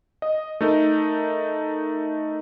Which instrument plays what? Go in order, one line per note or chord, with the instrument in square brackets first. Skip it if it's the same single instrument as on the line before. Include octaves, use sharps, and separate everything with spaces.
[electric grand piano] D#5
A3 D#4 A#4